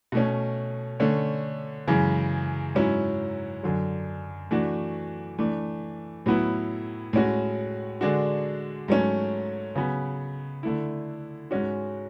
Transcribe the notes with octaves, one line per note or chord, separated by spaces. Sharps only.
B2 A3 C#4
D3 A3 C#4
F#2 C#3 E3 G#3
G#2 F#3 C#4 E4
F#2 D3 F#3
E3 A3 D4 F#4
E3 A3 D4
A2 F#3 B3 E4
A2 G#3 C#4 F#4
D3 G#3 D4 F#4
G#2 F#3 A3 C#4
C#3 F#3 B3
D3 A3 E4
G#2 G#3 C#4 F#4